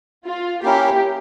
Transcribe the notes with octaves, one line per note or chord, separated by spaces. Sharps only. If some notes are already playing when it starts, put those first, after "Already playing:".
F4
A#3 C#4 E4 G4 A#4